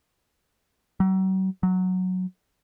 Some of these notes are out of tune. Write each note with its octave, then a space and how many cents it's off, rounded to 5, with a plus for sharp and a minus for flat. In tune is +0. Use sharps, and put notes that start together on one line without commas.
F#3 +40
F#3 -5